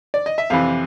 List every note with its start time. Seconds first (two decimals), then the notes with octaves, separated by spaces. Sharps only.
0.14 D5
0.26 D#5
0.38 E5
0.50 F2 C3 E3 F5